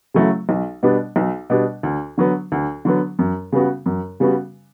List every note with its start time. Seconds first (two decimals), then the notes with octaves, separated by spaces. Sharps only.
0.14 C#3 F#3 A3 E4
0.49 B1
0.83 B2 G3 B3 D4
1.16 B1
1.50 B2 G3 B3 D4
1.83 D2
2.18 D3 F#3 B3
2.52 D2
2.85 D3 F#3 B3
3.19 F#2
3.52 C#3 G3 B3 F#4
3.86 F#2
4.20 C#3 G3 B3 F#4